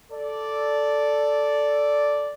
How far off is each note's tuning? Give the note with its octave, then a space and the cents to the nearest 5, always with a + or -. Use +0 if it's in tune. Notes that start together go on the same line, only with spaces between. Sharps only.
A4 +0 D5 -5